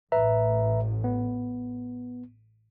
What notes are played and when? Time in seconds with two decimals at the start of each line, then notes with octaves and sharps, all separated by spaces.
0.12 A1 A2 B4 E5 A#5
1.04 B3